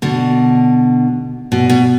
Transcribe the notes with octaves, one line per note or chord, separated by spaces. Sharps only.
B2 D3
B2
B2